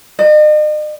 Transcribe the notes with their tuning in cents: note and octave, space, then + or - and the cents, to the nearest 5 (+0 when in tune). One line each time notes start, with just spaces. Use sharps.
D#5 -45